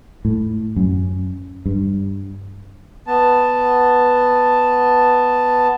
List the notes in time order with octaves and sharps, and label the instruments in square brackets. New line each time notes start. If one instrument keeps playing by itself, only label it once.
[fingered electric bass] A2
F#2
G2
[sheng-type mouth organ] B3 A5